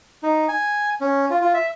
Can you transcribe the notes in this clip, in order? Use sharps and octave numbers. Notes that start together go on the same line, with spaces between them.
D#4
G#5
C#4
F4
F4
E5